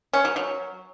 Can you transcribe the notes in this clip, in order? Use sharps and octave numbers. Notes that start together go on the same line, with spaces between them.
C#4
F#3
F#3